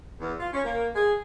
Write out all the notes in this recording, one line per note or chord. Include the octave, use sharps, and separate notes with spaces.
E2
F4
C#4
A#3
G#4